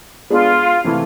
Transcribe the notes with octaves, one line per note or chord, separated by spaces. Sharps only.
G#3 B3 D4 F4 G#4
C3 E3 A3 E4